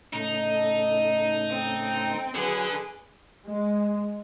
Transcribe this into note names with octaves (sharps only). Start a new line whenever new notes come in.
A2 C#3 A3 D#4
A4
C4
D3 F#3 G#4 B4 G#6
G#3